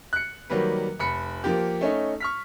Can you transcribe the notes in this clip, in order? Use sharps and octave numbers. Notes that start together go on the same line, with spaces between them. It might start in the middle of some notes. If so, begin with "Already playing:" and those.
F#6 C#7
D#3 F#3 G3 A#3 B4
F1 B5 C#7
F3 A#3 G4
A3 C#4 D#4
C#6 F6 B6